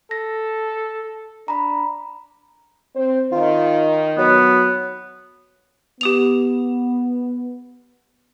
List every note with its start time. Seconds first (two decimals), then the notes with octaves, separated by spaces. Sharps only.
0.11 A4 A#6
1.48 D4 A#5 B5
2.95 C4 C5
3.32 D#3 F4
4.18 F#3 B3
6.01 B3 G4 D#6 F7